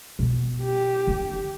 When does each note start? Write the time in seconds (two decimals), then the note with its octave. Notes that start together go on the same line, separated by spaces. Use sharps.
0.19 B2 B3
0.63 G4
1.07 D3 D4